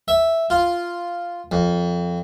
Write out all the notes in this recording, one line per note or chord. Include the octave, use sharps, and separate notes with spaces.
E5
F4
F2